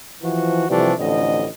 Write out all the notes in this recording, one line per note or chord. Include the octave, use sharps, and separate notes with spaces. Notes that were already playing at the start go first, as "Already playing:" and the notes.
E3 F3 F#4
C3 E3 F3 G3 A3 D4
A1 F2 A2 D3 D#5